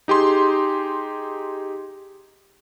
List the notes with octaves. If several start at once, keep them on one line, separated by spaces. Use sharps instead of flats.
D#4 G4 G#4 C6